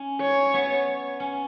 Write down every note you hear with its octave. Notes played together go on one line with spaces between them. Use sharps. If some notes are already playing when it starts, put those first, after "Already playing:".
Already playing: C#4
C#5
B3
C#4